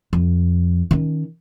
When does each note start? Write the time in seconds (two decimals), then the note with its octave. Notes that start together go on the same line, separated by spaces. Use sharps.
0.13 F2
0.91 D#3 C#4